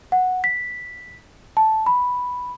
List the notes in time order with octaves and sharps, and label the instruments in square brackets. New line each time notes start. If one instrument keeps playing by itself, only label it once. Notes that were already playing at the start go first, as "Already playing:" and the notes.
[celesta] F#5
B6
A5
B5